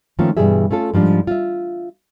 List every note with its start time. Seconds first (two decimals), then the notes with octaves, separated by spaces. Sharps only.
0.19 D#3 F3 A3 A#3 C#4 F4
0.37 G2 B2 E3 G3 G#4 E5
0.71 A3 C#4 F4 A4
0.94 G#2 F3 G3 D4
1.27 F4 E5